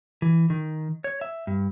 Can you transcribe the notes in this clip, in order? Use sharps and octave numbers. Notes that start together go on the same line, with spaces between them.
E3
D#3
C#5
E5
G2